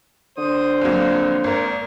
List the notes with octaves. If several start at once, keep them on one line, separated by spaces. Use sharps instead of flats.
D3 C5 D#6
F2 F#3 A#3 F5
G#1 A#4